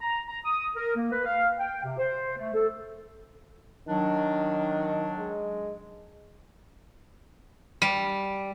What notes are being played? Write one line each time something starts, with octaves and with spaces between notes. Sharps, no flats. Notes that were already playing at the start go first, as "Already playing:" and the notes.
A#5
A#5
D#6
A#4
A#3
B4
F5
G5
C3
C5
A3
A4
D#3 F#3 D4
G#3
G3